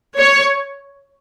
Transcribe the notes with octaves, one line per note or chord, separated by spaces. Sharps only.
C#5